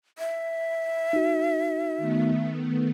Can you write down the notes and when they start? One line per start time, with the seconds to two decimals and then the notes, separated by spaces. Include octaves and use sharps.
0.18 E5
1.13 D#4 F#4
1.98 D#3 A3 B3